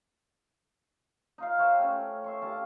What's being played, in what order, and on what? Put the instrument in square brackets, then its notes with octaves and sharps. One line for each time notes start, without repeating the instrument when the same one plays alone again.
[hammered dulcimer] D#4 F4 F5
C5 C#5 E5 G5
A3 C#4
E5 C6 C#6
E4 G4 F5 A5